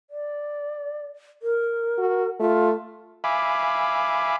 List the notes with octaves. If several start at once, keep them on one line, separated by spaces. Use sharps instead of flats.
D5
A#4
F#4
A3 F4
E5 F5 G#5 B5 D6